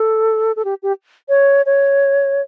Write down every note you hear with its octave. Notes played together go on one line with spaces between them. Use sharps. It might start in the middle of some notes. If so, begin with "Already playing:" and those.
Already playing: A4
A4
G4
G4
C#5
C#5